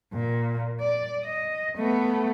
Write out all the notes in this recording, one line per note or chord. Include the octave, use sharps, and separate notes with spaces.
A#2
D5
D#5
A3 B3